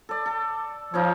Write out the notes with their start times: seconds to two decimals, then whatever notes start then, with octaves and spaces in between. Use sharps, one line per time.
0.09 A4 D5
0.26 A4
0.94 F3 D#4 F4 C#5